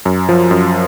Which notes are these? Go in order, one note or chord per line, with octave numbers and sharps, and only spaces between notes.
F#2
F3
F#2